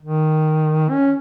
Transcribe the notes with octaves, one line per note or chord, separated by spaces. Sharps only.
D#3
C#4